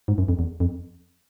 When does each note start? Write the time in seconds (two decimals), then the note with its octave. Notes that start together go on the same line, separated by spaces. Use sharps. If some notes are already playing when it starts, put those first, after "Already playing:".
0.08 G#2
0.18 F#2
0.28 F2
0.39 E2
0.60 F2